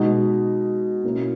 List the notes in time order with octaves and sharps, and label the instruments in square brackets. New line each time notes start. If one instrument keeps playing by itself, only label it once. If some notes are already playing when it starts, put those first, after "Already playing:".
Already playing: [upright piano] B2 G#3 D#4 F#4
B2 A#3 C#4 E4